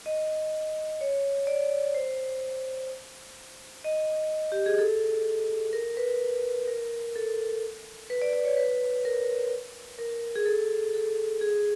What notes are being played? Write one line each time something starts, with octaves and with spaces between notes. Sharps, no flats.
D#5
C#5
D5
C5
D#5
G4
G#4
A4
A#4
B4
A#4
A4
B4
D5
D5
C#5
B4
A#4
A#4
G#4
A4
A4
G#4